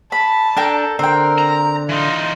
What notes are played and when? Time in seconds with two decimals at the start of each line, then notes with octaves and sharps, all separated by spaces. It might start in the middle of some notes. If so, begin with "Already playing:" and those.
0.12 A5 B5
0.57 D4 A4 A#4 G5
0.99 D3 C4 A#4 G5
1.38 A#5
1.89 E3 D#4 F4